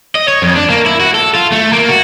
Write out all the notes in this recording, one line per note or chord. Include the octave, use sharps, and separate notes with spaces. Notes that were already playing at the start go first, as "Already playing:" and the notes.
D#5
C#5
F2
D4
A#3
E4
F#4
A4
F4
A3
A#3
F#4